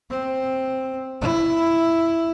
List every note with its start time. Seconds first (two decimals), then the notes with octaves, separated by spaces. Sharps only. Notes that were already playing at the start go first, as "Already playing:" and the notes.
0.10 C4
1.21 E4